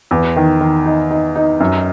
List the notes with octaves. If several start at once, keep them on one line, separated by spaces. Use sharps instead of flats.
E2
D#3
D#3
D#4
D#4
D#4
F#2